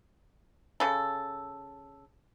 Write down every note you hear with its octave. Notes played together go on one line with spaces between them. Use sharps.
C#3 A4